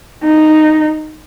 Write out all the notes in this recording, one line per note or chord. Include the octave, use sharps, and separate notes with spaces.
D#4